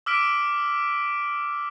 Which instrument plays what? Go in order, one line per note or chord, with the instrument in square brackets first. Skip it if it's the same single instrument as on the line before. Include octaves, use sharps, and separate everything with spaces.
[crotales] D6 E6 F6 B6 D7